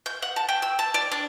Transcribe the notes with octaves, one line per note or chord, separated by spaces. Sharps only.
G6
F#5
A5
G5
E6
A5
D5
D4